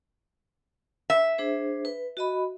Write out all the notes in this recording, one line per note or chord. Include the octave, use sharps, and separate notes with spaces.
E5
D4 G#4 C5
B4
F#4 D#5 B5